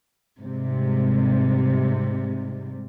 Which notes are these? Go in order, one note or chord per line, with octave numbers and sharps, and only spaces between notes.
G#2 C3 G3